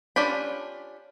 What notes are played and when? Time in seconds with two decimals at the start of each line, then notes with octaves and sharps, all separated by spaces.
0.16 C#4 D4 F4 G4 B5